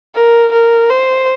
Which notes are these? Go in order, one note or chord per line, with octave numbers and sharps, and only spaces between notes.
A#4
A#4
C5